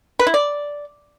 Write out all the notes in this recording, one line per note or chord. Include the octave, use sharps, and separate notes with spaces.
B4
E4
D5